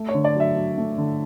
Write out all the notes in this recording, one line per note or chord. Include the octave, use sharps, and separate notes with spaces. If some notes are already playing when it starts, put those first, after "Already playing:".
Already playing: A3
C#5
D3
D5
F#3 E5
F#3
A3
D3